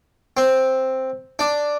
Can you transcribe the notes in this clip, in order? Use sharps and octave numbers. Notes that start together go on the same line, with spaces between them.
C4
D4